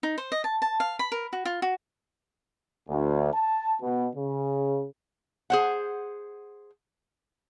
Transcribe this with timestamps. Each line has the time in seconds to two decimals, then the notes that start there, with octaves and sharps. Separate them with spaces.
0.03 D#4
0.18 C5
0.32 D#5
0.44 A5
0.62 A5
0.80 F5
0.99 B5
1.12 A#4
1.33 F#4
1.45 F4
1.62 F#4
2.89 D2
3.34 A5
3.82 B2
4.16 C#3
5.50 G#4 C5 F#5